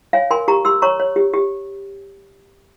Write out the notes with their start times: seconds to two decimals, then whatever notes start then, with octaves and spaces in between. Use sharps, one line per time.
0.13 C#5 F5 G#5
0.31 A#4 G#5 C6
0.48 G4 A#5 C#6
0.65 G4 C6 E6
0.82 C#5 A#5 C#6
1.00 C#5
1.16 G4
1.33 G4